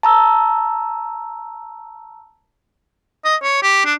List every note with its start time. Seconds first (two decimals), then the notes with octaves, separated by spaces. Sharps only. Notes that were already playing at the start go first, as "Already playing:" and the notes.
0.03 A5 A#5 E6
3.25 D#5
3.43 C#5
3.62 G4
3.85 D4